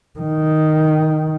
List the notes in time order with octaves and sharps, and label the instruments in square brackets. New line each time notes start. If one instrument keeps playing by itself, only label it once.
[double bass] D#3